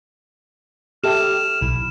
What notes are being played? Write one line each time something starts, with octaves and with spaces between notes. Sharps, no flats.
G4 A4 E5 F6 E7
B1 E4